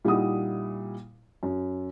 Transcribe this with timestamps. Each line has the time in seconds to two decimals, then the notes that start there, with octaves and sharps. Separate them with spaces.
0.05 A#2 G3 D#4 E4 F#5 D#6
1.43 F#2